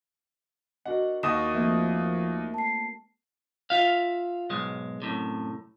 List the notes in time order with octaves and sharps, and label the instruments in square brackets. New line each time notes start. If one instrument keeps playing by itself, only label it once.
[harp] D4 F#4 A#4 [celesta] D#5 [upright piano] F#5
[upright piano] D#2 D#5 D#6 [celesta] F#5 C#6 E7
[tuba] F3 [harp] A3 A#3 C4 [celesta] E5
[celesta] A5 C7
[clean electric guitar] F4 E5 F5
B1 G#2 G#3
F#2 A2 C3